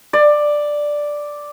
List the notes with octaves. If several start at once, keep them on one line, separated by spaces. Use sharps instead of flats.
D5